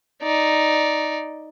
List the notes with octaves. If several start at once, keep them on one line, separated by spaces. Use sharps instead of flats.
D#4 D5